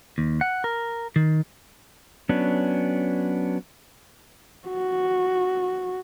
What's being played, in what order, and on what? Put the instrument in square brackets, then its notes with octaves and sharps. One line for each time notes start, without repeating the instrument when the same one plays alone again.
[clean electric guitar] D#2
F#5
A#4
D#3
[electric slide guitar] F#3 B3 C#4 D4
[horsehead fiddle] F#4